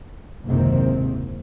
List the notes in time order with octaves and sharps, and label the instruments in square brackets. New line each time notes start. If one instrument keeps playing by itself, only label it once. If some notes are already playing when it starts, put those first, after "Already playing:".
[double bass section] F#1 D#2 G#2 C3 D#3 C4